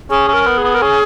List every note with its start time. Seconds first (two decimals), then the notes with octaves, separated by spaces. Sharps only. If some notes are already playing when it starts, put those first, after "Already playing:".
0.10 C#4 G#4
0.28 C#4
0.33 A#4
0.46 B3
0.58 G#4
0.64 B3
0.75 A#4
0.82 C#4 G#4